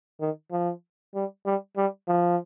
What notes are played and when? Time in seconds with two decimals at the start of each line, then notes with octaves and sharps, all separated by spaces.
0.21 D#3
0.52 F3
1.15 G3
1.46 G3
1.77 G3
2.08 F3